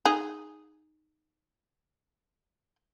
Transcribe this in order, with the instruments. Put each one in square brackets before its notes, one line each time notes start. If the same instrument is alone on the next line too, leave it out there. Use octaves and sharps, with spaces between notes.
[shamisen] D#4 G#4